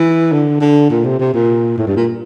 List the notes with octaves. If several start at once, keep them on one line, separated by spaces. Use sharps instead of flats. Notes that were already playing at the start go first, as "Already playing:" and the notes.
Already playing: E3
D3
D3
A#2
C3
C3
A#2
A2
G2
A#2